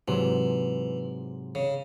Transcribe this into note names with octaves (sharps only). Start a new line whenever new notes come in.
G#2 C3 E3 F#3
C#3